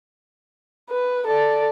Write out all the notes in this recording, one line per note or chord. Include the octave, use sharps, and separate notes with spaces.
B4
A4 D5